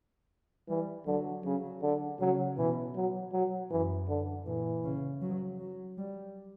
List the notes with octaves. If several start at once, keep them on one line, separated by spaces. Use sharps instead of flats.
E3 G3
D3 F#3
C#3 F#3
D3
C#3 F#3
B2 E3
F#3
F#3
F#2 E3
D3
A#2 E3
C#3
F#3
F#3
G3